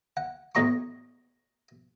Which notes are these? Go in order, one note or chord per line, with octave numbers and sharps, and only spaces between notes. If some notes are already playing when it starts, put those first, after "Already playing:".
F#5
E2 A2 D#5 A#5 C#6